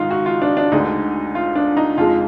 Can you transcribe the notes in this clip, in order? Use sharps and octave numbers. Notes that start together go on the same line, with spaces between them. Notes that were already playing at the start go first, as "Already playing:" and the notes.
Already playing: G#2 D#3 D#4 F4
F#4
F4
D4
D4
D2 D3 G#3 D#4
F4
D4
D#4
F2 F3 G#3 F4